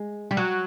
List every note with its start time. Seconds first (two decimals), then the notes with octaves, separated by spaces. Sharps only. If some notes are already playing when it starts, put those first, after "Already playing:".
Already playing: G#3
0.31 G3
0.37 F#3